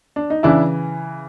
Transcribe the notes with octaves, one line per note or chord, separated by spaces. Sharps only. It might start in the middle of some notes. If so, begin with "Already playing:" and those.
D4
D#4
C#3 E3 D4 E4